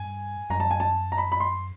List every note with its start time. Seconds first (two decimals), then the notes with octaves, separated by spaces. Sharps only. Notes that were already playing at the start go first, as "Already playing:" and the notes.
Already playing: G2 G#5
0.50 F#2 A#5
0.60 A5
0.71 G#5
0.80 A5
1.12 A#5
1.18 B5
1.32 B5
1.40 C6